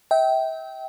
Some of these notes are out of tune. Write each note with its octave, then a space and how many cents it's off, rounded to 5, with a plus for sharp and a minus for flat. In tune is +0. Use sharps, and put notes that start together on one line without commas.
E5 -35 G5 -15